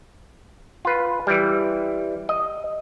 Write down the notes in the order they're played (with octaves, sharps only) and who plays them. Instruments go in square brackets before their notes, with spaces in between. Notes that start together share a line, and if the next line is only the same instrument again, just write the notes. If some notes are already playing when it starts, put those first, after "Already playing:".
[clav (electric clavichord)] F4 B4
E3 G3
D#5